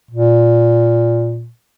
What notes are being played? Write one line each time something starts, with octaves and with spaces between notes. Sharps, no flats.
A#2